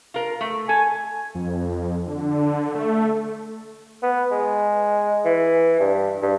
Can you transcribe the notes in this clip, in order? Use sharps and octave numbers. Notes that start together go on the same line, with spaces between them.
F4 A#4
A3
A4 G#5
F2
D3
A3
B3
G#3
E3
G2
G2